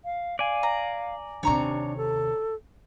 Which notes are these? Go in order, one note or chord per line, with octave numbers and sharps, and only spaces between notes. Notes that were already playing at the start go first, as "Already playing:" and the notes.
F5
D5 F5 G#5
A#5
D#2 C3 D4 C#5 A#5 C#6
A4